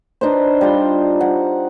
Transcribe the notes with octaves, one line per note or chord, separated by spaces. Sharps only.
D4 D#4 B4 C5
G3 F4 C5 C6
F#5